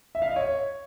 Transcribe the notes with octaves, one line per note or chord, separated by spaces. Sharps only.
E5
F5
D#5
C#5